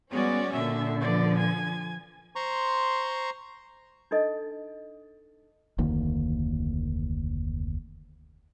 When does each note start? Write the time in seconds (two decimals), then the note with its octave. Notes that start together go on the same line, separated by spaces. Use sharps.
0.11 G3 G#3 B3 C#4 F#4 D5
0.53 A#2 D3 D4 E5
1.01 F3 B4 D5
1.38 G#5
2.36 C5 A#5 C6 C#6
4.11 D4 D#4 A4 D#5
5.78 F1 D2 D#3 A#3